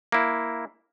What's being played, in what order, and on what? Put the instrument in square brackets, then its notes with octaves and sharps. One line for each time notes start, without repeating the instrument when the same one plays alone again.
[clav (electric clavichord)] A#3 E4